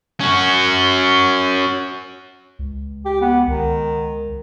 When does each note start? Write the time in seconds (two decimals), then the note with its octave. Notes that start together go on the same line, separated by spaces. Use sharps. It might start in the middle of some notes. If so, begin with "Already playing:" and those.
0.20 C#4 F#4
2.59 C#2
3.05 G4
3.21 B3
3.48 C#2 D#3